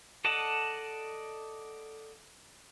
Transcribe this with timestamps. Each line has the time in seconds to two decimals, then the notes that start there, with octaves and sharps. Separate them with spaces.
0.25 A4 D5 D#5 F#5 A5